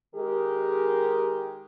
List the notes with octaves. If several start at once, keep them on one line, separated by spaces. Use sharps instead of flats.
D#3 G#3 G4 G#4 A#4